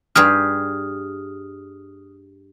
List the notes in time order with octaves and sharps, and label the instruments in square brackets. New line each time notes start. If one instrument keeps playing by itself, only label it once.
[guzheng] G2 G4 G#4 [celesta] D#6 F6